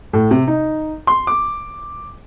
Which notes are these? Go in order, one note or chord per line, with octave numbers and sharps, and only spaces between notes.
A2
C3
D#4
C6
D6